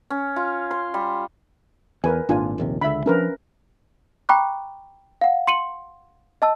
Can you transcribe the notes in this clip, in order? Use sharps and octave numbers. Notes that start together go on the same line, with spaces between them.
C#4
F4
C6
G3
E2 A#4 B4 G#5
G#1 A#2 D4 F4 G#5
A#1 D#2 C3
C#2 D3 E5 B5
F3 C#4 D4 A#4 B4
G5 A#5 B5 C#6 D6 F#6
F5 F#5
C6 C#7 D#7 F#7
D#5 A5 E6